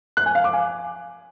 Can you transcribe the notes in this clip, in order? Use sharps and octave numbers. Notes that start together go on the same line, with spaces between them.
F#6
G#5
F5
D6
G#5